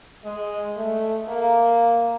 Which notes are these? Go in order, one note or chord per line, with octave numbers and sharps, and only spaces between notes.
G#3
A3
A#3